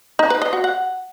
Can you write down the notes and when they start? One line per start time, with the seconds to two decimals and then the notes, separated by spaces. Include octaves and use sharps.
0.19 D#4
0.30 B4
0.42 D#5
0.53 F#4
0.64 F#5